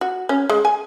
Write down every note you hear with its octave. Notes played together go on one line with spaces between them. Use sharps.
F#4
C#4
G#3
G#5